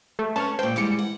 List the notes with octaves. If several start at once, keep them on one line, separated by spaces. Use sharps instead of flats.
A3
C#4 B4 C#5 A5 C#6 F6
A#2 C5 G5
E3 G3 G#3 D6 C#7
F#5